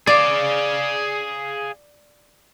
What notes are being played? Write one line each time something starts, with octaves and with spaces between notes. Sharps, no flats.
G#4 D5 F5